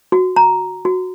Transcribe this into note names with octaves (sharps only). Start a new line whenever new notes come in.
F#4
A#5
F#4